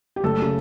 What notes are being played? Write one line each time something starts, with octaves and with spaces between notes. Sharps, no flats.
G4
F#1 A3 A4
C#3